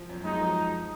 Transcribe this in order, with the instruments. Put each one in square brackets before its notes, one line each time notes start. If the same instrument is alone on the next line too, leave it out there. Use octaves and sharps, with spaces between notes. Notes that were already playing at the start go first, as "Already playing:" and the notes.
Already playing: [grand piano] F3
F#2
[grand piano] G#3 [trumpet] D#4
[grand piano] F3